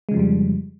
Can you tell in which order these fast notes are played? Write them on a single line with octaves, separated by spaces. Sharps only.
G#3 C#3 F3 F2 G3